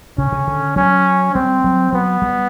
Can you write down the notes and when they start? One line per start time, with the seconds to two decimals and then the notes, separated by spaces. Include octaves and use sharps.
0.18 C#3 C#4
0.32 C#3
0.47 D3
0.76 F#3 C#4
1.34 G3 C4
1.64 F#3
1.93 F#3 B3
2.22 G3